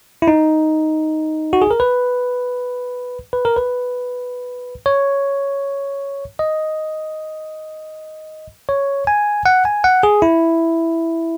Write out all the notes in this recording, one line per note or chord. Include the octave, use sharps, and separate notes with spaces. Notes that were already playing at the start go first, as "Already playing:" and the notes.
E4
D#4
F#4
G#4
A#4
B4
B4
A#4
B4
C#5
D#5
C#5
G#5
F#5
G#5
F#5
G#4
E4